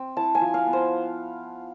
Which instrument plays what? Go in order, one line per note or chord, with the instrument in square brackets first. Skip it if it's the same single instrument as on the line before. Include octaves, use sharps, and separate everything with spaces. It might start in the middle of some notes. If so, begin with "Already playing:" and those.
Already playing: [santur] C4
E4 A5
G#5
F3
F5
B3
C5